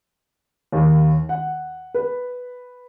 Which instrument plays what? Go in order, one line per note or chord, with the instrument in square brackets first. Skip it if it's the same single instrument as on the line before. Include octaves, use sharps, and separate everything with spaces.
[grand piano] D#2
F#5
B4